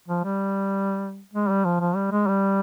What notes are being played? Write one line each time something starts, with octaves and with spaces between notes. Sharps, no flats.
F3
G3
G#3
G3
F3
F3
G3
G#3
G3